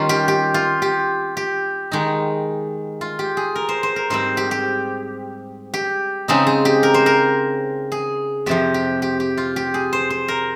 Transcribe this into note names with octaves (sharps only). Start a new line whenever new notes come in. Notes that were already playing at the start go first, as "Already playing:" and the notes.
Already playing: D#3 G3 C#4 F4
G4
G4
F4
G4
G4
D#3 G#3 D#4
F4
G4
G#4
A#4
C5
C5
A#4
G#2 G3 C4 C5
G4
G4
G4
C#3 G#3 C4 D#4 G#4
G#4
G4
A#4
C5
A#4
G#4
F2 C3 F3 G4
G4
G4
G4
F4
G4
G#4
C5
C5
A#4